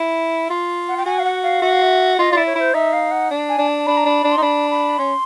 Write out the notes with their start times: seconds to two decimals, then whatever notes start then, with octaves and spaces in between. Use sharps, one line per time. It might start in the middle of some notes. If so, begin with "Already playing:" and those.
Already playing: E4
0.50 F4
0.88 F#5
0.97 G5
1.06 F#4 G#5
1.19 F5
1.24 F#5
1.43 F5
1.62 F#4 E5
1.72 F5
1.82 E5
2.18 F4 D#5
2.32 E4 F4 D5
2.46 C#5
2.55 E4 C5
2.74 D#4 E5
2.93 F5
3.11 F#5
3.30 D4
3.49 G#5
3.58 D4
3.68 A5
3.86 D4 B5
3.97 A#5
4.05 D4 B5
4.24 D4
4.32 C6
4.37 D#4
4.42 D4 B5
4.71 B5
4.99 C#4 C6